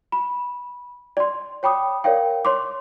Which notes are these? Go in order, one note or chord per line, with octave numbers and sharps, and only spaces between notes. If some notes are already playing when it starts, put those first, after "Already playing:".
B5
D5 C6
C#5 G5 B5 D6 D#6
A#4 C#5 D5 F5 G5
C#5 C6 D6